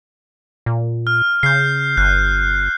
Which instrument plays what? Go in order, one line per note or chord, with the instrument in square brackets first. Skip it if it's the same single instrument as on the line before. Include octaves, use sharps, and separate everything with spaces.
[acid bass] A#2
[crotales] F6
[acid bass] C#3 [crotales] G6 C7
[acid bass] G1 [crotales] F#6